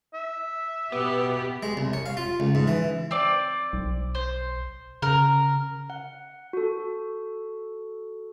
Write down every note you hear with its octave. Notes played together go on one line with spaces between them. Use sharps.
E5
B2 B3 G4
G#3
C2
C#5
F5
F4
C#2
G#2
E3
C4 D5
B1
C5
C#3 A#4
F#5
F#4 A4